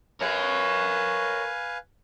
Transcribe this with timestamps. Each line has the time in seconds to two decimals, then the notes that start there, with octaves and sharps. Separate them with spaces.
0.21 A#4 B4 C#5 F5 G#5